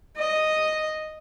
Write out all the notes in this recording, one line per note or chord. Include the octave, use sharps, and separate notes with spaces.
D#5